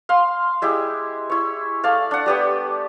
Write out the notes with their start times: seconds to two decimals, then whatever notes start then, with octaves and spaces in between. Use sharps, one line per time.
0.09 F5 C6
0.62 G#3 E4 G4
1.30 E4 C#5
1.84 A3 D5 F5
2.11 D4 F#5
2.26 G3 B3 G4